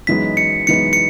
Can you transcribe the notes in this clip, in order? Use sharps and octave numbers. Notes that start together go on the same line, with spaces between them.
F#2 E3 G#3 B3 D#4 B6
C#7
F#2 E3 G#3 B3 D#4 C#7
C#7